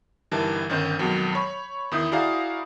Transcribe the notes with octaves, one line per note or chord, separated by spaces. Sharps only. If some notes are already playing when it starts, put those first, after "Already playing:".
G1 E3 G3 D#4 A#4 A5
G1 D#3 C#4 D#4 C5 G6
F2 B2 D#3 F#3 G#3
C#5 B5
E2 D#3 E4 D#6 G6
E4 F#4 G#4 D5 F5 A#5